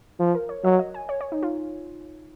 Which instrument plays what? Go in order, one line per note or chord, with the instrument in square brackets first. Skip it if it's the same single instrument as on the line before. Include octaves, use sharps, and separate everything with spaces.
[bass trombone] F3
[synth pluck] A#4
C#5
[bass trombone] F#3 [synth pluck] D#5
[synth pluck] D#5
G#5
C#5
C#5
D#4
F4